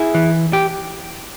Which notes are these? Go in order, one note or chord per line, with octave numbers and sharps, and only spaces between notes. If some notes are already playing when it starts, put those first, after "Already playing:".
Already playing: E4 G#4
E3
G4